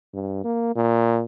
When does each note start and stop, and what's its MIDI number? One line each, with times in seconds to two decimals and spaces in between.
0.14 0.41 43
0.44 0.71 58
0.76 1.23 46